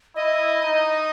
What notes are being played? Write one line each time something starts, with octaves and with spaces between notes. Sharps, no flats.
E4 D#5
D#4